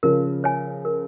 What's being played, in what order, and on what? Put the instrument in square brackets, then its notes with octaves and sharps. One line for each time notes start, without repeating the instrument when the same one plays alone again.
[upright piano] C#3 F3 [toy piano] A#4
[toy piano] C#5 G#5
A#4